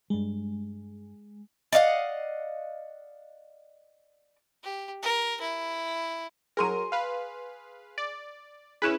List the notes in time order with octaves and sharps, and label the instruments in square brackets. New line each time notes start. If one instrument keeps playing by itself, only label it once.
[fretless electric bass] G2 G3 [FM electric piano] G#3
[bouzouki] D5 D#5 F5 F#5
[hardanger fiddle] G4
A#4
E4
[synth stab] F#3 A#4 [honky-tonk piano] G#4 C6 D#7
[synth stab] B4 F5
D5
[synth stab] C#4 E4 B4 [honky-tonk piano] G#4 F#6 E7